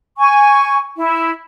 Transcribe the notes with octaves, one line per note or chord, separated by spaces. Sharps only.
G#5 C#6
E4